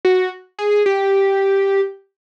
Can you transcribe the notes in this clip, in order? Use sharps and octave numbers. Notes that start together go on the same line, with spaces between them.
F#4
G#4
G4